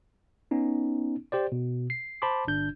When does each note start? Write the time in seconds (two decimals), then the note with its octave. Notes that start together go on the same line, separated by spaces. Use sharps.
0.51 B3 C#4 D#4
1.32 G4 C5 D5
1.52 B2
1.90 C7
2.22 C5 A5 B5 C6 D6
2.47 G1 D4 G6